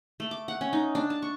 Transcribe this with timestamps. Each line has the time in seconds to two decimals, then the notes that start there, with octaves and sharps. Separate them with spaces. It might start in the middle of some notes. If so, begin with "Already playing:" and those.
0.20 A3
0.31 D6
0.48 F#5
0.61 C#4
0.73 D#4
0.95 D4
1.10 A5
1.22 C#6